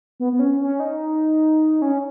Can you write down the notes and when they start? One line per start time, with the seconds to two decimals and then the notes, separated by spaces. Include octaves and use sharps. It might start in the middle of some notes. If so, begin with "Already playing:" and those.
0.20 B3
0.33 B3
0.39 C#4
0.61 C#4
0.80 D#4
1.82 C#4